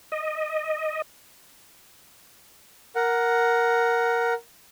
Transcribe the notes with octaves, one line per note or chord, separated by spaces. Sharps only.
D#5
A#4 F#5